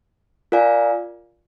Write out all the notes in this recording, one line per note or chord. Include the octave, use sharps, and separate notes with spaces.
F4 A#4 D5 F5 G#5